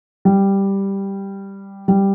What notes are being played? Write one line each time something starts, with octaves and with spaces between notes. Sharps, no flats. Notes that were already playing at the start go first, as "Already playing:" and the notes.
G3
G3